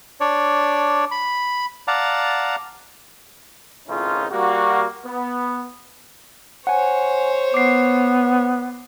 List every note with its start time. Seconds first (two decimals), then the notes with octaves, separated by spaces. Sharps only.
0.20 D4 C#5 D5
1.11 B5
1.88 D5 F5 F#5 A5 A#5
3.88 G#1 C#2 A2 C#4 D#4 F4
4.32 G3 A#3 F#4
5.05 B3
6.67 C5 C#5 F#5 G#5
7.54 B3 D6 C7